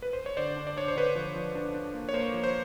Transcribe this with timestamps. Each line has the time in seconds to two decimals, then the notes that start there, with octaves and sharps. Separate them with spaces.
0.02 B4
0.13 C5
0.26 C#5
0.37 D3 C5 D5
0.57 D4
0.67 D5
0.77 D4 C#5
0.88 C5
0.96 D3 B4 C#5
1.15 F3
1.36 F3
1.55 D4
1.74 D4
1.94 A#3
2.09 C#5
2.14 A#3 C5
2.34 F3
2.44 C5